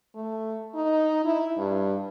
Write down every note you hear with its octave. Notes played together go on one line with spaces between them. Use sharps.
A3
D#4
E4
G2